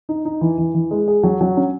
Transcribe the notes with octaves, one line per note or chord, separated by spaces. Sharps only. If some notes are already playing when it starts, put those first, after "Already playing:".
D#4
D#4
E3
E3
E3
G#3
G#4
F#3
F#3
C#4